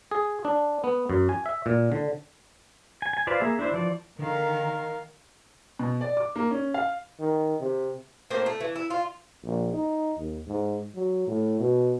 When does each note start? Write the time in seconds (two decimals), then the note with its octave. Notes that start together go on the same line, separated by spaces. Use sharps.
0.11 G#4
0.45 D4
0.84 B3
1.10 F#2
1.29 G#5
1.46 E5
1.66 A#2
1.92 D3
3.02 G#5
3.13 G#5
3.27 F4 B4 C5 D5 F5
3.40 A#3 G#4 E5
3.59 D4 E4 C5 E5
3.72 E3 F3 D5
4.19 D3 D#3 A#4 F5
5.79 B2
6.01 D5
6.17 D6
6.36 A#3
6.51 C#4
6.74 F5
7.20 D#3
7.60 C3
8.30 A2 A#3 C4 C5
8.46 A3
8.61 E3
8.76 E4
8.90 F4
9.44 A#1
9.73 D#4
10.17 D#2
10.47 G#2
10.95 F#3
11.27 A2
11.60 B2